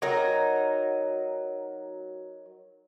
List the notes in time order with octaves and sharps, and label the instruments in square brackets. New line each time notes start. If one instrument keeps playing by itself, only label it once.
[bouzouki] F#3 D#4 A#4